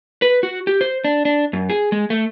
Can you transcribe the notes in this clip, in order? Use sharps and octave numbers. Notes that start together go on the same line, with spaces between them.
B4
F#4
G4
C5
D4
D4
F#2
G#4
G#3
A3